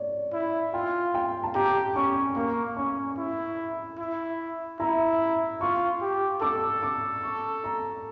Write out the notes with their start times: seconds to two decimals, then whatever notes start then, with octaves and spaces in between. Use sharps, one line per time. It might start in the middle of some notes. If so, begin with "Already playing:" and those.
Already playing: C#5 D5
0.33 E4
0.74 F4 G5
1.14 G5
1.43 A5
1.55 G4 A#5
1.96 C#4 C#6
2.36 A#3 C#6
2.77 C#4 C#6
3.18 E4
3.99 E4
4.80 E4 A#5
5.61 F4 C#6
6.01 G4
6.42 A4 D6
6.83 D6
7.23 C#6
7.64 A#5